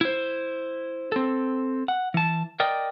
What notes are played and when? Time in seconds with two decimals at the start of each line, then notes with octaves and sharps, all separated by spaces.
0.01 E4 C5
1.12 C4 A4
1.88 F#5
2.14 E3 A5
2.60 A#4 D5 D#5 G5